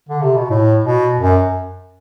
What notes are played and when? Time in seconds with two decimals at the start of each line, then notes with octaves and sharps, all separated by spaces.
0.09 D3
0.23 C3
0.36 B2
0.50 A2
0.84 B2
1.19 F#2